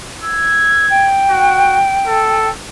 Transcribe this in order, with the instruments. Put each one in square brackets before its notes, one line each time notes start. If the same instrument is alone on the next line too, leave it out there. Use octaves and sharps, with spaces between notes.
[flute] E6 [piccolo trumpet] G#6
[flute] G5
[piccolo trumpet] F#4
A4